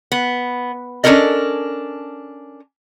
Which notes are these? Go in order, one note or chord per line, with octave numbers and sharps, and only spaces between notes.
B3
C#4 D4 E4 A4 A#4 D#5